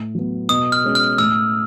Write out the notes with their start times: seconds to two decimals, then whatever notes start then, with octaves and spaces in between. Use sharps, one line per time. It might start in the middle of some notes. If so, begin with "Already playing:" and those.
Already playing: A2
0.15 F#3 B3
0.49 B2 D#6
0.72 F6
0.84 G#3 C#4
0.95 F6
1.18 A2 E6